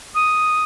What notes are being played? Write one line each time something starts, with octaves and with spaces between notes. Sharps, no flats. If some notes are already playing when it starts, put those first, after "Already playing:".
D#6